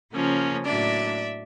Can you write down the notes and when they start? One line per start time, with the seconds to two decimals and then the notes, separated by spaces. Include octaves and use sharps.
0.13 C#3 F3 A#3 C#4
0.66 A2 F#3 A#3 D4 D5 E5